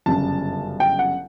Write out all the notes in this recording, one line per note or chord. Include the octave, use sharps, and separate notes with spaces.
G1 F#2 C#3 A5
G5
F#5